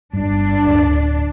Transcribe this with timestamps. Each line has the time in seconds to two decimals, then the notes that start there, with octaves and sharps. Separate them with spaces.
0.13 G1 G2 D4
0.67 D1